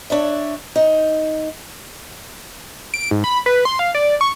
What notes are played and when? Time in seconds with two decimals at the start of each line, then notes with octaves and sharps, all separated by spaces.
0.10 D4 C#5 E5
0.76 D#4
2.94 D7
3.11 G#2
3.24 B5
3.46 B4
3.65 C6
3.79 F5
3.95 D5
4.21 C#6